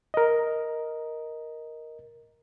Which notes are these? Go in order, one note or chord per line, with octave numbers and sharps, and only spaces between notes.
A#4 D#5